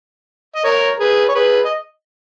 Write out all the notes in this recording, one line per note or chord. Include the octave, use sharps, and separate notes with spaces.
D#5
A#4 C#5
G#4 B4
C#5
G#4 B4
D#5